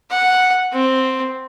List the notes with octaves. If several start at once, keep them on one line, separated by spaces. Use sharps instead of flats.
F#5
C4